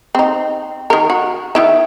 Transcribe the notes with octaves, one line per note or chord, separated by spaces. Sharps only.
C4 D#4
D#3 A#4
F#4
D#3 E4 E5